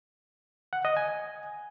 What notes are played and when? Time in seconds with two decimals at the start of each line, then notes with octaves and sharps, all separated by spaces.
0.73 F#5
0.85 D#5
0.97 G#5